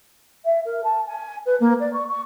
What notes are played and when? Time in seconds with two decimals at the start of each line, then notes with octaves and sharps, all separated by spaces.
0.44 E5
0.65 A#4
0.83 A5
1.06 G#5
1.45 B4
1.60 A#3
1.80 D5
1.93 C#6
2.08 C#6